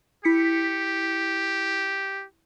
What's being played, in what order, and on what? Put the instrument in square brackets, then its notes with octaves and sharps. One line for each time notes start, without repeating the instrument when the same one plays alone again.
[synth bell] E4 B6 C#7 [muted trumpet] G4